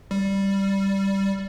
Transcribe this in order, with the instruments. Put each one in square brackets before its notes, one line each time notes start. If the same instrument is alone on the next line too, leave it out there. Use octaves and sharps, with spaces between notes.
[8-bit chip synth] G3